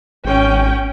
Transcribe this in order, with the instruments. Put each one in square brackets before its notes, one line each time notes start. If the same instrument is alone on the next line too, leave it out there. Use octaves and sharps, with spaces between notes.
[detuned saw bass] G#1 [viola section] C#4 G5